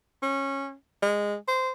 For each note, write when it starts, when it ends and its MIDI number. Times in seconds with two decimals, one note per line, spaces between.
0.22 0.74 61
1.03 1.36 56
1.48 1.72 72